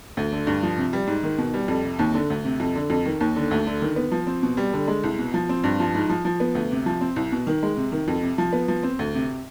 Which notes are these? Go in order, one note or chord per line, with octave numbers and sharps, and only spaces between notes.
D2
D3
G2
F3
C3
G3
G#2
D#3
B2
G3
F2
C3
D#2
D3
D2
C3
F2
D3
F2
D#3
D#2
D3
D2
D3
D#3
B3
F3
C4
B2
G3
D3
G#3
C2
B2
F3
C4
G2
F3
G#2
F3
F3
B3
D2
C3
F3
C4
C2
B2
D#3
G#3
C3
D#3
F2
C3
F3
B3
F3
C4
D2
C3